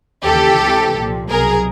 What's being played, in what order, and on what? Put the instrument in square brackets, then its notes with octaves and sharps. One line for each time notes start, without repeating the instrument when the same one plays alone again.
[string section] D#2 C#3 E3 G4 A4
C#2 C3 E3
C2 A#2 F3
C2 B2 F#3 G#4 A#4